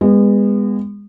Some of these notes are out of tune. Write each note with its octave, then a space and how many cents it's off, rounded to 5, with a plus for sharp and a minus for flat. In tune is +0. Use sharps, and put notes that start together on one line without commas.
G#3 -35 B3 +0